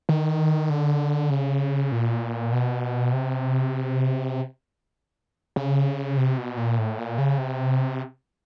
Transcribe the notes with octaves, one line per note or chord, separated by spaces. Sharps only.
D#3
D3
C#3
A#2
B2
C3
C#3
C3
B2
A#2
A2
A#2
C#3
C3